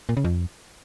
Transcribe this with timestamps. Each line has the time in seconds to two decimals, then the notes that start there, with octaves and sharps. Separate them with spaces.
0.09 A#2
0.17 C#3
0.25 F2